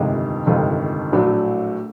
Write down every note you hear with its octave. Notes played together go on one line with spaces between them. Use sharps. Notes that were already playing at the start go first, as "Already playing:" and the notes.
Already playing: G1 F2 C3 D#3 G#3
G1 F2 C3 D#3 G#3
A#1 A2 F#3 A3 D4